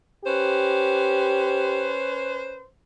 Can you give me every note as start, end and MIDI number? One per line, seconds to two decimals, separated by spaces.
0.25 2.64 61
0.25 1.95 67
0.25 2.64 71
0.25 2.64 72